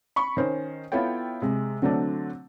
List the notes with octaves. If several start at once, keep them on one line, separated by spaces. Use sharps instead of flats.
B5 C#6
D#3 C#4 C5
B3 E4 F4 A4 C#5 G5
C3 G#3
D3 F#3 A3 C4 D4